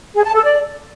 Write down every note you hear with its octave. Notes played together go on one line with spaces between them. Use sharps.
G#4
A5
A4
D5